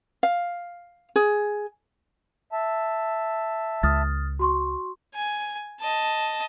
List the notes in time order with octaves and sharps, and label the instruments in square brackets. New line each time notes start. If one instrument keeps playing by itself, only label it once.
[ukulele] F5
G#4
[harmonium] E5 A5
[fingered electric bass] C#2 [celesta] D#6 F6 A6
[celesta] F#4 C6 C#6
[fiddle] G#5
D#5 A5